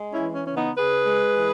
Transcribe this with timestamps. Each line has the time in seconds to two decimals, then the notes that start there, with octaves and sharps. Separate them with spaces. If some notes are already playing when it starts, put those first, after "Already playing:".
Already playing: G#3
0.12 C#4 E4
0.20 E3
0.33 C#4
0.47 C#3 C#4
0.55 B3 D#4
0.77 C#3 G#4 B4
1.06 G#3
1.36 E3